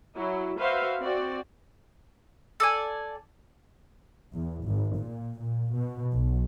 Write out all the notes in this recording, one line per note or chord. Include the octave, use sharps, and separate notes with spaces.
F#3 E4
F#4 B4 C5 E5 F5
C4 F#4 D5
A4 D5 G#5
E2
G#1
A#2
A#2
B2
B1